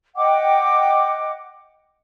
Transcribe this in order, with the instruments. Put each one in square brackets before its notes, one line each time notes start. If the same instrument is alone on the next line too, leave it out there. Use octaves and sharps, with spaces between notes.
[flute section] D#5 F#5 G5 D6